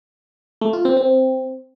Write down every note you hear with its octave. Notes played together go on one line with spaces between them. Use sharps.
A3
F4
C4
C4